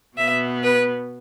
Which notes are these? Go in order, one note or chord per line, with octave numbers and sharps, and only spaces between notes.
B2 B3 E5
B4